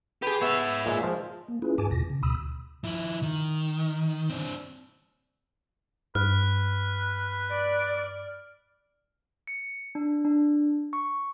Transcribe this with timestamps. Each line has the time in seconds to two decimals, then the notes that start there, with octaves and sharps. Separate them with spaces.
0.22 G4 G#4 B4
0.42 B3 C#5 E5
0.86 A#2 G#3
1.03 F3 G#3
1.48 A#3
1.62 C#4 E4 F4 G#4 B4
1.78 G2 G#4 G#5 A5 D6
1.91 E2 B2 A#6
2.10 C#3
2.23 D2 B2 B5 D#6 E6
2.84 F3 E4
3.23 D#3
4.30 C4 D4
6.15 G2 B4 F6
7.51 D5
9.47 C#7
9.95 D4
10.25 D4
10.93 C#6